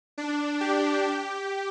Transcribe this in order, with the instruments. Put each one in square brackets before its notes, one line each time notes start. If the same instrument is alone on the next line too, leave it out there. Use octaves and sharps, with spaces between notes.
[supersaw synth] D4
G4
G4